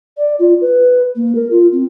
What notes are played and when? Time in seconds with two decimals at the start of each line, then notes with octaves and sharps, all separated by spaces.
0.17 D5
0.39 F4
0.61 B4
1.16 A#3
1.35 A#4
1.51 F4
1.72 C4